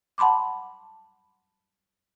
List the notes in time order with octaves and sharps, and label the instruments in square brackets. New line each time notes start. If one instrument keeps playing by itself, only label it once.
[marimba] F#5 A5 B5 C6 D6